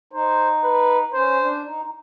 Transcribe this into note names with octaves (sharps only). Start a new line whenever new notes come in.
D#4 C5
B4
C#4 C5
D4
D#4
D#4